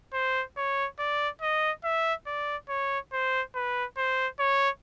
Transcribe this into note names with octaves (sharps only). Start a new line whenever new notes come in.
C5
C#5
D5
D#5
E5
D5
C#5
C5
B4
C5
C#5